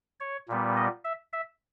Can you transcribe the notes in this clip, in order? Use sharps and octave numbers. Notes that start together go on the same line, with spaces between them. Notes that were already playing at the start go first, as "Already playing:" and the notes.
C#5
A#2 G3 B3
D#5
E5
E5